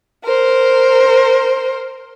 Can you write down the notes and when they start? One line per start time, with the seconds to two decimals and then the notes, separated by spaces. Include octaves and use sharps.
0.23 A#4 C5